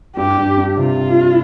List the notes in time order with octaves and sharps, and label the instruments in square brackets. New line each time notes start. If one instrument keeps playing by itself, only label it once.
[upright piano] G2 [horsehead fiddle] G4
[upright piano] G2
G2
[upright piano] C3 [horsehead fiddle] F4